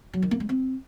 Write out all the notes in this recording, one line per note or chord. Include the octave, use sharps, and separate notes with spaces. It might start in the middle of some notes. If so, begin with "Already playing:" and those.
F#3
D#3
A#3
G#3
C4